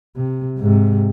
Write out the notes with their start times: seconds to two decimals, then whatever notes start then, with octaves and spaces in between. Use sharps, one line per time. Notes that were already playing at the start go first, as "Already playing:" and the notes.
0.16 C3
0.58 G#2 C3